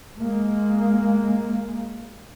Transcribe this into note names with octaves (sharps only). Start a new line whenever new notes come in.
G#3 A#3